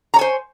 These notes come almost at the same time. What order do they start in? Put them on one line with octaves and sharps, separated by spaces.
A#5 C#5 G#5 C5